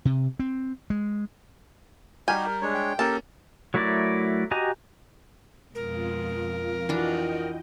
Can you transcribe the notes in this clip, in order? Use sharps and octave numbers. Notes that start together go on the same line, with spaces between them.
C3
C4
G#3
G3 D#4 F#4 G4 G#5 F6 G6
A#4
G#3 D4 C#5
G5
A#3 C#4 G4 A4 A#4 A5
F#3 A3 E4 A#4 D5
F#4 G4 D#5 G#5 A#5
F2 B2 G#3 F4 A#4
E3 D4 F4 F#4 D#5 G5